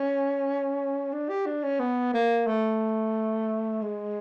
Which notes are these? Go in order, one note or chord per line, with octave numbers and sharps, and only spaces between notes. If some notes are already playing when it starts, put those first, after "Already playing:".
Already playing: C#4
D4
G4
D4
C#4
B3
A#3
A3
G#3